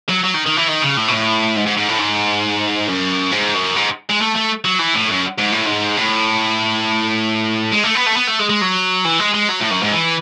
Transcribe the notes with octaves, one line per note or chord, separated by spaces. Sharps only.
F#3
F#3
D#3
D#3
E3
D#3
C#3
A2
B2
A2
G#2
G#2
G#2
A2
G#2
F#2
G#2
F#2
G#2
G#3
A3
A3
F#3
E3
A2
F#2
G#2
A2
G#2
A2
G#3
A3
B3
A3
B3
A3
G#3
G#3
F#3
E3
G#3
G#3
F#3
A2
F#2
G#2
E3